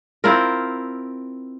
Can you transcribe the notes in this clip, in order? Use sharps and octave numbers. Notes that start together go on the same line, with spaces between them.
C4 E4 F4 A#4